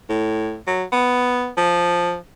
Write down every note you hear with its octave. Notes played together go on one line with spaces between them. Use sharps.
A2
F#3
B3
F3